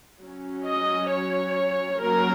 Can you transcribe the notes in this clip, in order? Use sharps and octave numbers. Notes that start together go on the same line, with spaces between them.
F#3 C#4
D#5
C#5
F#3 A#3 C#4 A#4